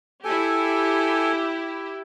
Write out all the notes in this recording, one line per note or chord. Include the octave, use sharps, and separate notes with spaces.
E4 G4 A4 G#5